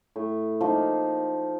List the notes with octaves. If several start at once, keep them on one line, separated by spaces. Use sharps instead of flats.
A2
F3 A#3 D#4